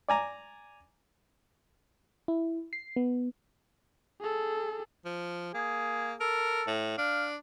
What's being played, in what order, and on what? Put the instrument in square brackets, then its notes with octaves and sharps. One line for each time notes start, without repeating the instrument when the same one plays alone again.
[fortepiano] D5 G#5 A#5
[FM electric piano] E4
C7
B3
[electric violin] G#4 A4
[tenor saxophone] F3
[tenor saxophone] A#3 [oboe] G#4
[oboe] A4 [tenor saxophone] A#4
[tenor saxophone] A2
[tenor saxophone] D4 [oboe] F5